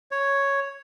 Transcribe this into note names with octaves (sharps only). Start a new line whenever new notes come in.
C#5